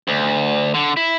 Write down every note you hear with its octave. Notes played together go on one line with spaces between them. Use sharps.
D2
D3
E4